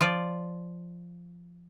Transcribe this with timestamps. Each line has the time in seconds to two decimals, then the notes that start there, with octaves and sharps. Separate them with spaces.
0.01 F3 F4 D5